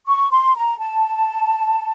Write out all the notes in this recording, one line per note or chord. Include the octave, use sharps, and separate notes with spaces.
C#6
C6
A#5
A5